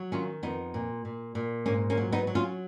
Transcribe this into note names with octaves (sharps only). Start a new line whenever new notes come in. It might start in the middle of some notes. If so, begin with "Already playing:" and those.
Already playing: F#3
D#3 C#4 F4
F2 B3 D#4
A#2
A#2
A#2
G#2 A#3 C#4
A#3 C#4
F#3
B3 D#4
F#3
C#4 F4